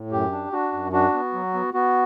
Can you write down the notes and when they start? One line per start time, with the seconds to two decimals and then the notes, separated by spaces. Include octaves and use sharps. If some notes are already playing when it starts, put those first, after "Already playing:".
Already playing: A2
0.11 F#2 G4
0.32 D4
0.52 D4 F#4
0.73 F#2
0.92 D4 F#4
1.13 B3
1.33 F#3
1.54 B3
1.74 B3 F#4